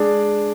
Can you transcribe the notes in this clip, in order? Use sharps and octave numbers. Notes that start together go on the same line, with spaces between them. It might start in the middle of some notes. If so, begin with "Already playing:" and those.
Already playing: G#3 D4 G#4 D5